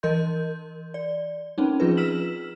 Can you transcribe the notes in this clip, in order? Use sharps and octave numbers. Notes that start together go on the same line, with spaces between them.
E3 A#4 D#5 C6 G6
D5
C4 C#4 D#4
F3 F4 G#4 B4
E6 F6 B6 E7 F#7